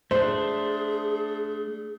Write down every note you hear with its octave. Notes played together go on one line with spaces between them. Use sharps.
A3 D4 G#4 C5